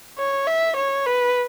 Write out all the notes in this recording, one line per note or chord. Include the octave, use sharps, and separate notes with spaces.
C#5
E5
C#5
B4